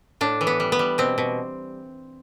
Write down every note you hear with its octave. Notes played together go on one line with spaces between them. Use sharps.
A2 D4
E3
B3
G3
B3
G3
B2 C4
B2